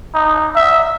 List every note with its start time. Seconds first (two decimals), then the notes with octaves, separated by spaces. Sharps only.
0.14 D#4
0.55 E5